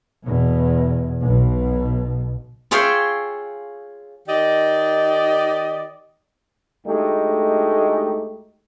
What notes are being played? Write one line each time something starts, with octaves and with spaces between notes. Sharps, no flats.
E2 B2
B1 B2
F4 G#4 C#5 E5 F5 G5
D#3 G4 D5 D#5
D2 G#3 A3 D#4 G4